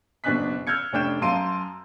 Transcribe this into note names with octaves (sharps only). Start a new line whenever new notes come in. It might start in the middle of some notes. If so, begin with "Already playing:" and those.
F#1 B2 D4 G#5 F#6 B6
E6 F6 G6 G#6 C#7
F1 C#4 D4 G5 G6 E7
F#2 F5 A5 C6 D7 D#7